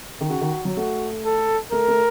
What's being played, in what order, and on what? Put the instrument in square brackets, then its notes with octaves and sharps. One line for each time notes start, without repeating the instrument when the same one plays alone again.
[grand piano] D#3
[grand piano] C#3 [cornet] F#4
[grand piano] D#3
F#3
[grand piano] A3 [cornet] F#4
[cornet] A4
[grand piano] A3 [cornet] A#4
[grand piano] A3